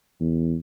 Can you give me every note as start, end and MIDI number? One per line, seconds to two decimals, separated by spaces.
0.20 0.56 40